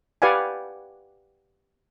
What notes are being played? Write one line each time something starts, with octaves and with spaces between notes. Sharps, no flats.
G4 B4 D5 F5 F#5 G#5